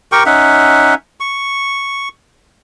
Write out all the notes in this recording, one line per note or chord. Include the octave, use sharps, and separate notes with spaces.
G4 A#4 G5 C#6
C#4 D#4 E5 F#5
C#6